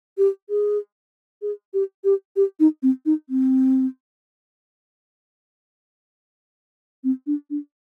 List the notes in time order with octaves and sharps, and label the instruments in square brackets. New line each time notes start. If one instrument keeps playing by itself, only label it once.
[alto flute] G4
G#4
G#4
G4
G4
G4
D#4
C4
D#4
C4
C4
D4
D4